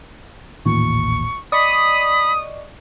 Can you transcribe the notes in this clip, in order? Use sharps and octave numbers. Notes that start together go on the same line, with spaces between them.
A1 D#2 A#2 C#6
D5 D#5 B5 C#6 D#6